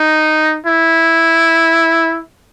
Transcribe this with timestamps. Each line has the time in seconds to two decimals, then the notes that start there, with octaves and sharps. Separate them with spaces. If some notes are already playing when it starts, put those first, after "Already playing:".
Already playing: D#4
0.66 E4